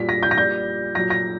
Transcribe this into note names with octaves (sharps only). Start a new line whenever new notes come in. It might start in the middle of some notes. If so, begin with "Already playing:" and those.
Already playing: A#2 G3 B6
A#6
G6
A#6
A#2 G3 G6
A#2 F#3 A#6
A#6